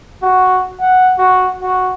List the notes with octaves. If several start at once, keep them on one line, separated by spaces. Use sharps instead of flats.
F#4
F#5
F#4
F#4